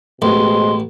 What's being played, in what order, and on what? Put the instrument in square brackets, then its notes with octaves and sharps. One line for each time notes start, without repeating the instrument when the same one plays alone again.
[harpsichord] A1 [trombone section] B2 G#3 C4 [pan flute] C6